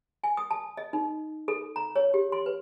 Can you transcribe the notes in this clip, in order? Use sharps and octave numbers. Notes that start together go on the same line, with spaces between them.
G#5
D#6
A5
D#5
D#4
A4
A#5
C#5
G4
C6
B4